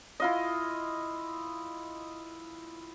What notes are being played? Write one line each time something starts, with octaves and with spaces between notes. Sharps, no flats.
E4 F4 D#5